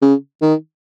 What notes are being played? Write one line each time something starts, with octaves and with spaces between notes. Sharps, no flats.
C#3
D#3